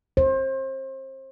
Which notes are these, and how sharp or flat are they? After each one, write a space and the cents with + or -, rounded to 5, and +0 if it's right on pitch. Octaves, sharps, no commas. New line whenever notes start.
C5 +30